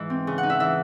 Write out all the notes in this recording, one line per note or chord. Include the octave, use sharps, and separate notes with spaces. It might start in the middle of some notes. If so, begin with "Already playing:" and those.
Already playing: G#2 E3 G#3
C4
C#3
F#5
D#4
E5
E3 E5